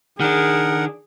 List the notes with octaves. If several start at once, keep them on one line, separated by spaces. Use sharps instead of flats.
D#3 D4 G#4 A#4 F#5